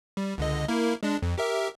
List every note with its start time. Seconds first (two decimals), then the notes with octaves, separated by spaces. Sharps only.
0.17 G3
0.38 C#2 D3 D#5
0.68 A#3 E4 A#4
1.03 G#3 D4
1.23 F2
1.38 G4 A#4 E5